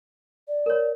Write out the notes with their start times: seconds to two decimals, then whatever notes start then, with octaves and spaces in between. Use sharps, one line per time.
0.48 D5
0.66 A#4 C#5